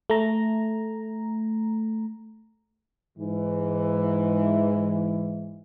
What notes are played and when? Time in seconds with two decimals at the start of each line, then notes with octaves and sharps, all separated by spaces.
0.10 A3 A#5
3.18 G#2 E3